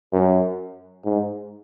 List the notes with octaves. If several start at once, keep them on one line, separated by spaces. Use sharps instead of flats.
F#2
G#2